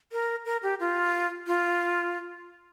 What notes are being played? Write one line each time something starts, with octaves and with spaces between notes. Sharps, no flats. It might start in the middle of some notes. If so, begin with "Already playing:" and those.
A#4
A#4
G4
F4
F4